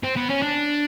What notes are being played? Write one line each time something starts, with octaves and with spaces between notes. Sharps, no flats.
C4
B3
C#4
D4